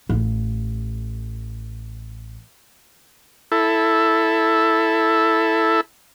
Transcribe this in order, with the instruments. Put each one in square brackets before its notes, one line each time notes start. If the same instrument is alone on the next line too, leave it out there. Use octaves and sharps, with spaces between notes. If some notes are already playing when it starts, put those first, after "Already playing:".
[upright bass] A1 D#4
[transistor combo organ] E4 A4